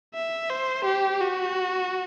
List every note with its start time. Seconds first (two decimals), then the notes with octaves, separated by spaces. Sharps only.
0.14 E5
0.50 C5
0.85 G4
1.21 F#4